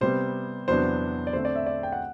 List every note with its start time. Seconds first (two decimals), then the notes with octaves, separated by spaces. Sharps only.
0.01 C3 G3 B3 C5
0.68 E2 C3 F#3 B3 D4 C5
1.27 D5
1.33 D3 A3 C4 C5
1.45 D5
1.56 E5
1.66 D5
1.83 G5
1.92 F#5